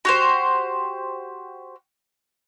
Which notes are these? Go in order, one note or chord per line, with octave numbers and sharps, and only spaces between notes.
F#4 G4 C5